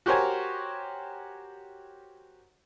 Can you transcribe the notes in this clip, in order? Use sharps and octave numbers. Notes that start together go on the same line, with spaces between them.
F#4 G4 A#4 C5 C#5 G#5